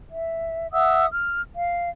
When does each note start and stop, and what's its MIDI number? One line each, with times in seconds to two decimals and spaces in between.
0.11 0.68 76
0.73 1.05 76
0.73 1.05 78
0.73 1.05 87
0.73 1.05 88
1.12 1.42 89
1.57 1.88 77